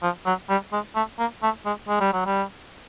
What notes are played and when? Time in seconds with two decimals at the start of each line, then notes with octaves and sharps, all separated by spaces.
0.03 F3
0.26 F#3
0.49 G3
0.72 G#3
0.95 A3
1.19 A#3
1.42 A3
1.66 G#3
1.88 G#3
2.01 G3
2.13 F#3
2.26 G3